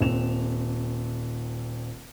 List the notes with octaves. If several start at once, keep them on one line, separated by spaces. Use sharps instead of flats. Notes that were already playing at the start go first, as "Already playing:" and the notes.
D#1 C4 E7 F7